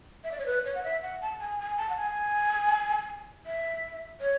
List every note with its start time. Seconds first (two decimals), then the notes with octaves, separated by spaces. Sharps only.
0.24 E5
0.32 D5
0.39 C#5
0.46 B4
0.65 C#5
0.75 F#5
0.84 E5
1.03 F#5
1.21 A5
1.40 G#5
1.59 G#5
1.78 A5
1.90 F#5
1.96 G#5
3.46 E5
4.21 C#5